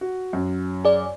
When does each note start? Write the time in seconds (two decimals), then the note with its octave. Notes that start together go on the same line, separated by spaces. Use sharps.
0.01 F#4
0.33 F#2
0.85 G#4 D5